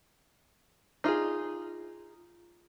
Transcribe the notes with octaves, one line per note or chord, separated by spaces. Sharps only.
D#4 F4 F#4 G#4